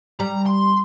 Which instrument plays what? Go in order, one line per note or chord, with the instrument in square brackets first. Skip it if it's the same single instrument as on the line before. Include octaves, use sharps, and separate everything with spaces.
[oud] G3 [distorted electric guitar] A#5
[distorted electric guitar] C6